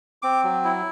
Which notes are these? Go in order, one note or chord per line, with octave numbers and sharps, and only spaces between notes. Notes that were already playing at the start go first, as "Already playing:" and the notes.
C4 D6
F#3
E4